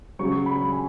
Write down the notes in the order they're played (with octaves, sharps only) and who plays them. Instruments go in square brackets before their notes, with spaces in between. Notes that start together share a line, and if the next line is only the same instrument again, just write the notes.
[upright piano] C#3 F#3 C#6
B5
G#5